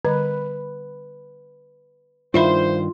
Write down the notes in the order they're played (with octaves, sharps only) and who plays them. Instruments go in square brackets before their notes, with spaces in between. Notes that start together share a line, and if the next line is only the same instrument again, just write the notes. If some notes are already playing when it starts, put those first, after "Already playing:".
[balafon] D3 G3 [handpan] B4
[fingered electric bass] G2 D#3 [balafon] E4 E5 B5 [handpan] F4 [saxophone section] C5